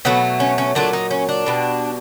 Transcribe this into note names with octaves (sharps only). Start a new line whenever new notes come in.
B2 F#3 A3 B3
C#4
C#4
A#2 F#3 A3 D4
D#4
C#4
D4
B2 G3